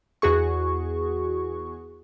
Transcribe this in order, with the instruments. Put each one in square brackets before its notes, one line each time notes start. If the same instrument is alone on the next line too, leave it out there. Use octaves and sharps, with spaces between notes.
[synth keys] E2 F#4 G#4 C#6